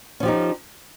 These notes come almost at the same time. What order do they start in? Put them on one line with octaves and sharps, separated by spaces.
C#4 F3 G4 D#4